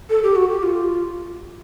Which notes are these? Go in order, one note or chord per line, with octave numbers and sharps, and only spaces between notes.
A4
G4
F#4
G4
F4